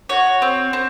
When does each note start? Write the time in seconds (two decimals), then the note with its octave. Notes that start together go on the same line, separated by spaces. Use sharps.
0.09 F#4 C#5
0.42 C4
0.73 C4